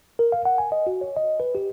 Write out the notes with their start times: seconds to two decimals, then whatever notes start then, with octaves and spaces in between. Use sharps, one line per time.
0.19 A#4
0.32 F5
0.45 F#5
0.58 G#5
0.72 D#5
0.87 F#4
1.01 C#5
1.17 D#5
1.40 B4
1.55 G4